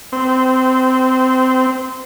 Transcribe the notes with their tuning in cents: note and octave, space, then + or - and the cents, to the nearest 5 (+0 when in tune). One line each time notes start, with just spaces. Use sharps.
C4 -20